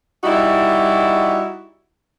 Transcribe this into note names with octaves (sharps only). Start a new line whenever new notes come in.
G3 D#4 E4 F#4